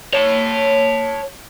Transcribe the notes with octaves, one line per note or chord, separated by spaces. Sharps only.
C#5 A5